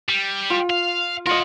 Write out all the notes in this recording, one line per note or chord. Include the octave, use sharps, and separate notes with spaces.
G3
F4
F5
F4 A#4 D#5 F#5